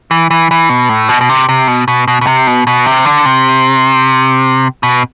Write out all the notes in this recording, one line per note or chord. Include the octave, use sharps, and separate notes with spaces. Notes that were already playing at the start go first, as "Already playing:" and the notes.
E3
E3
E3
B2
A2
B2
B2
C3
C3
B2
B2
B2
B2
C3
B2
B2
C3
D3
C3
B2